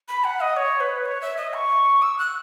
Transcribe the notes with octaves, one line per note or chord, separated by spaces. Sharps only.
B5
F#5
D#5
C#5
B4
C#5
E5
D#5
C#6
E6
F#6